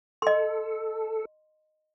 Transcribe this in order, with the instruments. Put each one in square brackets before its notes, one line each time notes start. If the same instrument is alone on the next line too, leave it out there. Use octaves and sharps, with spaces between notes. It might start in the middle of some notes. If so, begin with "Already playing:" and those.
[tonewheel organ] A4 [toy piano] D#5 C6